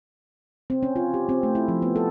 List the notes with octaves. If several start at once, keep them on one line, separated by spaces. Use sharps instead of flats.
C4
C#4
F4
G4
C4
A3
E4
F3
B3
A4